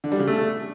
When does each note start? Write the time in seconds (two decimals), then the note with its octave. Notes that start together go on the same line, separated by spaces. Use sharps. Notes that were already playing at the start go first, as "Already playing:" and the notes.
0.04 D3
0.12 G3
0.20 C#3
0.28 A3